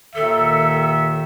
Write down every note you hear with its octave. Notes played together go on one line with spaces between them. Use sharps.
D#2 A#2 D#3 A4 E5